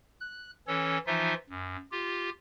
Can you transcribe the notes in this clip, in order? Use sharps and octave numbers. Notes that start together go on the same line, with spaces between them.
F#6
E3 C#4 A4 C#5
E3 F3 D#4 F4 E5
F#2
F4 G4